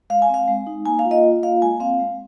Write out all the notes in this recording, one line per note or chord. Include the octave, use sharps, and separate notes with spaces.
G#3 F5
G#5
C4
F5
G#3
D#4
A#3 G#5
F5
F4
D#5
F4
A#3 F5
G#3 G#5
C4 F5
G#3